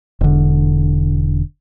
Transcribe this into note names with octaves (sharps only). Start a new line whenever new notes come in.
E1 D3